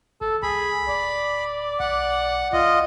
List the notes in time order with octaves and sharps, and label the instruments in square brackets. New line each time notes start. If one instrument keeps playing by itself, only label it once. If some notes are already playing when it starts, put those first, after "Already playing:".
[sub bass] G#1 [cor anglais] A4
[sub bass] C2 [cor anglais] G#4 [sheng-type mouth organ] B5
[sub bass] D1 [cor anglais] D5
[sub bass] B1 [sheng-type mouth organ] F#5
[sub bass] C2 [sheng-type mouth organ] F4 D#5